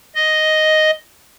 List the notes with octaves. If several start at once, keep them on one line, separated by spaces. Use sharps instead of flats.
D#5